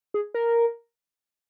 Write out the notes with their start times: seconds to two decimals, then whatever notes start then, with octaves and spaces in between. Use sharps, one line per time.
0.14 G#4
0.34 A#4